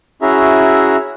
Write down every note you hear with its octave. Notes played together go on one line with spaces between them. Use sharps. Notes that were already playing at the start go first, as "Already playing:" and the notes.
C#4 E4 F#4 G#4 E5 A#5